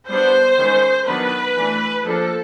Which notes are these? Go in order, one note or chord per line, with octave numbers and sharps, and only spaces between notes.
G3 B3 D4 C5
D#3 G#3 C#4
D#3 F#3 B3 D4 B4
E3 A3 D4
F3 A#3 D4 A4